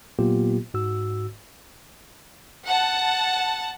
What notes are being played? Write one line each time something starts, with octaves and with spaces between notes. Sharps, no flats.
A#2 F#3 A#3 B3 F4 G4
G#2 F#4 E6
F#5 A5